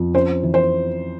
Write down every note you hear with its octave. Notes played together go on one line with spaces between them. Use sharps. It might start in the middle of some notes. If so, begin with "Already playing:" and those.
Already playing: F2
C#4 C5
E3
C5